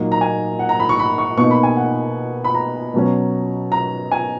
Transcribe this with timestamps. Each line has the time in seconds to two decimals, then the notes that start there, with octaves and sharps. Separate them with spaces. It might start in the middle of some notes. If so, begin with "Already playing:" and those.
Already playing: A#2 F#3 A#3 D#4
0.12 A#5
0.21 G#5
0.59 F#5
0.69 A#5
0.80 B5
0.89 C#6
0.99 B5
1.18 C#6
1.37 B2 A#3 D#4 C#6
1.51 B5
1.63 G#5
1.77 F#5
2.44 B5
2.55 A#5
2.94 B2 F#3 C#4
3.72 A#5
4.11 G#5